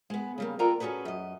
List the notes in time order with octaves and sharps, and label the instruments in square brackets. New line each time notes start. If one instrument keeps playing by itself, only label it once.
[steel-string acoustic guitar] G#3 B3
C#3 G3 A#3
F4 A4 A#4 D5 G5 A#5
C#4 F#4 G#4 A4 B4
F#2 D#5